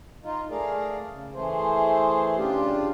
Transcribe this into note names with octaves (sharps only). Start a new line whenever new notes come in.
D#4 F4
A3 G#4 A#4 D5 F5
C#3
E3 A3 G#4 C5
C#3 D4 F4 G4